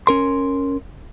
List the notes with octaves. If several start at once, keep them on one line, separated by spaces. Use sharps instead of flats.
C#4 A#4 C6